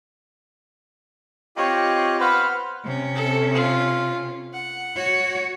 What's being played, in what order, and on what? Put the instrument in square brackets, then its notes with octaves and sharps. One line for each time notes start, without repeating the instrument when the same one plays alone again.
[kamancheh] C4 C#5 [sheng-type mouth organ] F4 G4 D#5
[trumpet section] B3 B4 C5 [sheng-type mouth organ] F5 F#5 B5 [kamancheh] F6
[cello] C3 C#4
[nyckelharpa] A4
F4
F#5
[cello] F#4 C#5